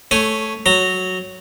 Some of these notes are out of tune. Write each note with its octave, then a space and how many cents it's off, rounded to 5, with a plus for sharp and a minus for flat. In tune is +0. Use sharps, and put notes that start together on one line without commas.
A3 -5 C#5 +0 G#5 +0
F#3 +0 A#5 -15